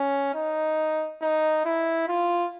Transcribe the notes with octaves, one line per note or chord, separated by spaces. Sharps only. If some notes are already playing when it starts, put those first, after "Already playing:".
Already playing: C#4
D#4
D#4
E4
F4